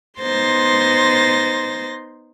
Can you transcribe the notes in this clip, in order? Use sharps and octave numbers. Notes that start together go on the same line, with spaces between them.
B3 D#4 C5 C6 A6 A#6